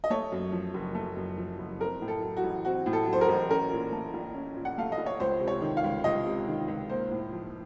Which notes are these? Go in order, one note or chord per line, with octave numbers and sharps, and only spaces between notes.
D#5
A3 C#5
F#2
F3
F#1
A3
F#2
F3
F#1
C4 A#4
A2
A4
F#3
F#4
A1
C4 F#4
A2
A4
F#3
C5
A#4
A1
C#4 A#4
A#2
A3
A#1
C#4
A#2
F#5
A3 F5
D#5
A#1
C#5
C#2 C5
C3
C#5
D#3
F5
C#2
C#2 D#5
C3
D#3
C#2
A#3 C5
A2
F3